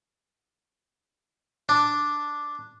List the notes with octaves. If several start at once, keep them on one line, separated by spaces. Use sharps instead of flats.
D4